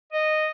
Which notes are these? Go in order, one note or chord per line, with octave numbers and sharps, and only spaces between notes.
D#5